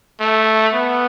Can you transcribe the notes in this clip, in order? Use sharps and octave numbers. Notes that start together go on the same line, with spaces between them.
A3
B3